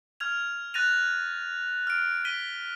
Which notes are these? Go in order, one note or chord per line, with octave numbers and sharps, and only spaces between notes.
F6 G#6 F7
F#6 A6 A#6 D#7 F7
F6 D7
B6 D#7 G7